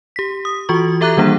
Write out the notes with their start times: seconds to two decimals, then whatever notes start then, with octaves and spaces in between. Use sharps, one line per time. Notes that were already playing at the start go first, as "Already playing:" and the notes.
0.16 G4 B6
0.45 D#6
0.69 E3 F4 F#4 C#6
1.01 G4 A4 E5 A#5 D6 F#6
1.17 D#3 E3 G3 A#3 D4 G#4